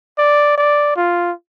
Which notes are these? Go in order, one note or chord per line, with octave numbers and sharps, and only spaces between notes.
D5
D5
F4